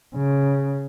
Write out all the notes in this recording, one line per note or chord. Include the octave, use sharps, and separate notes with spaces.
C#3